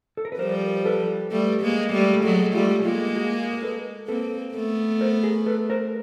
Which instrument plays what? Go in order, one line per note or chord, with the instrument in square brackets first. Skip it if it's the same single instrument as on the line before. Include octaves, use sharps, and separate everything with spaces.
[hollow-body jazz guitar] A4
A#4
B4
[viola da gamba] F3 G3 [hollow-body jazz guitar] A#4 C5
[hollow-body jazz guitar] A4 B4
[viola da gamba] G3 A3
G#3 A#3
G3 A3
[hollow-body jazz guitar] G#4
[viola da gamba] F#3 G#3 [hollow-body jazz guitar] G4 A4
[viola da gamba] G3 A3 [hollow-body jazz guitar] F4 G4
[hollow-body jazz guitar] G#4
[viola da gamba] G#3 A#3 [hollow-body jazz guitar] F4 G4
[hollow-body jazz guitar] F#4 G#4
A#4
A4 B4
[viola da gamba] A#3 C4 [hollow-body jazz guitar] A4 B4
[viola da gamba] A3 B3
[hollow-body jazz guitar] A#4 C5
G#4 A#4
A4 B4
A#4 C5